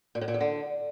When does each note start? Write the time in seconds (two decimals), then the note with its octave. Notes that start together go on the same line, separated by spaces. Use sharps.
0.15 A#2
0.21 A2
0.28 A#2
0.34 E2
0.41 D3